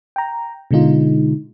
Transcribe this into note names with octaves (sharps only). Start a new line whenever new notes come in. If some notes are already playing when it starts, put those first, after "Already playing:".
G5 A#5
B2 D3 G#3 D#4 F4